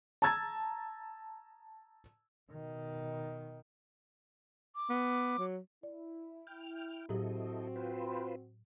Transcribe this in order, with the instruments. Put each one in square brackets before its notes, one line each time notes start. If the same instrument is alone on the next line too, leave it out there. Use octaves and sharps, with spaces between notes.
[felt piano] A5 A#5 E6 G#6 A6
[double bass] B2 D#3
[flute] D6
[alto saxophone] B3
F#3
[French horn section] E4 [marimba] D5
[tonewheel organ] G5 F6
[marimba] A2 F#3 G4 [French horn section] C4 F#4 [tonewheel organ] E4 A4 D#5
[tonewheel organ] F4 B4 C5